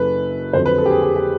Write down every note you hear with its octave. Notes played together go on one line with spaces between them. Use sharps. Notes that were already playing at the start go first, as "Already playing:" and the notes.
Already playing: F#1 F#2 C#3 A4 B4
F2 D3 F#3 C5
B4
A4
G4
G#4
G4
G4